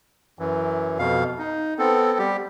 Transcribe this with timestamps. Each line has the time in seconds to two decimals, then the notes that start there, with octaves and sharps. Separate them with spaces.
0.39 F#2 E3
0.99 F2 B2 F5
1.38 D#4
1.79 B3 C4 A4
2.19 G3 G4